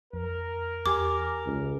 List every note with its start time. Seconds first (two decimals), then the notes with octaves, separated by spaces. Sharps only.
0.13 F2 A#4
0.86 E2 G4 G#5 D6
1.46 C#2